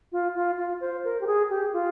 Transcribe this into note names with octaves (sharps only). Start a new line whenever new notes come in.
F4
F4
F4
C5
A#4
G4
G#4
G4
F4